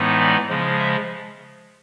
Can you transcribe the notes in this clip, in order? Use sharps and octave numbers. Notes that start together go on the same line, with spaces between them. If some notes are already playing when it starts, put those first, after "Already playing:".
Already playing: A2 E3 G#3 B3 D#4
D5
C#3 F3 G#3
E5